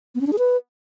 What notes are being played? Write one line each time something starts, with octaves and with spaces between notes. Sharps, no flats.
B3
C#4
D4
G#4
B4